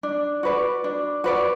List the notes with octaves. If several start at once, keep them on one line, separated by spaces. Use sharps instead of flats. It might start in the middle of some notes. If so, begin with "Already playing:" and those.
D4
F#4 B4 D5
D4
F#4 B4 D5